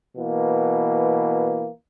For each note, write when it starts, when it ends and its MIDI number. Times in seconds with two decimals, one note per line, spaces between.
0.16 1.68 47
0.16 1.68 52
0.16 1.68 58